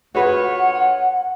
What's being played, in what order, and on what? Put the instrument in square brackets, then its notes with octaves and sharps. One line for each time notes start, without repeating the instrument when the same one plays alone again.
[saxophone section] D2 F4 C#5 [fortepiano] F#4 G#4 B4 [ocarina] F#5